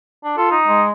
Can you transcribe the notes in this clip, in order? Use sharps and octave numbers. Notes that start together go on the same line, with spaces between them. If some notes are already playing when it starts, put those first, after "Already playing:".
D4
F4 A4
D#4
G#3